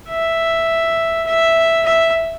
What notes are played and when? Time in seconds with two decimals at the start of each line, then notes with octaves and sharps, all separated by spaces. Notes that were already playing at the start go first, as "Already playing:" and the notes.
0.09 E5
1.27 E5
1.86 E5